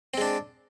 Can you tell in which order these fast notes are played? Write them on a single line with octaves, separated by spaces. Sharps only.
C4 G#3 D4